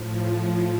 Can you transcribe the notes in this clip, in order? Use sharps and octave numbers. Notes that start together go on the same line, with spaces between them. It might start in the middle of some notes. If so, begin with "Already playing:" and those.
Already playing: A2 F3